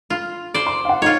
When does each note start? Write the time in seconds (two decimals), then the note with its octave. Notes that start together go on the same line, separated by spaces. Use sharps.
0.10 F4
0.54 C5 D5
0.67 C6
0.85 F5 F#5
1.02 D#4 F4 C#5